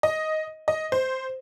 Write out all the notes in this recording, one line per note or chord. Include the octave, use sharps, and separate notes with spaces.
D#5
D#5
C5